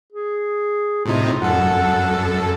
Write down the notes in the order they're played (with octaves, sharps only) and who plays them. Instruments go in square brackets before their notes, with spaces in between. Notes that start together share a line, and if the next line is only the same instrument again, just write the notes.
[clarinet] G#4
[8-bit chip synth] A2 C3 D#4 [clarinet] F4
[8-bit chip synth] F#2 A4 [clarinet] F#5